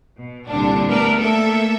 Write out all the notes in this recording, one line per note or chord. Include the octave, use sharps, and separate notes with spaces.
B2
C2 A#2 D3 D4
A3 B3 D4 A#4 B4
A3 A#3 A4 E5